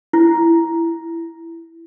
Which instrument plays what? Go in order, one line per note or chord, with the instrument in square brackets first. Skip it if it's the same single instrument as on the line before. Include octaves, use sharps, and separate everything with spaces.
[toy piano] E4